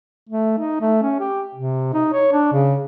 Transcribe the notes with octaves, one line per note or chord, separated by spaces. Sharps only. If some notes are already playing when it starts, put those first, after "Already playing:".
A3
D#4
A3
C#4
G4
C3
D#4
C#5
D4
C#3